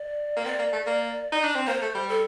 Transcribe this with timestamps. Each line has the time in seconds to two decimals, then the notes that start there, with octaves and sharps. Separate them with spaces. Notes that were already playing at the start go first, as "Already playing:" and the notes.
Already playing: D5
0.36 A#3
0.45 C4 D5
0.59 A#3
0.72 A3
0.86 A#3
1.32 D#4
1.44 D4
1.56 C4
1.67 A#3 C5
1.82 A3
1.95 G3
2.09 A4